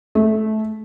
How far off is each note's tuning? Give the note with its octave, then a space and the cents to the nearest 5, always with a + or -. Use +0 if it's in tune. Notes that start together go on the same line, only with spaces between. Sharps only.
A3 -20